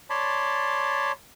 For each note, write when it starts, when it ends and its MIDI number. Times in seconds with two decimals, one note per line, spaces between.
0.10 1.12 73
0.10 1.12 74
0.10 1.12 81
0.10 1.12 83
0.10 1.12 84